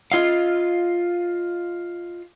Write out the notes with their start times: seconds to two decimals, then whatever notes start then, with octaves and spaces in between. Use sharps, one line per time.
0.12 F4 D#5 F5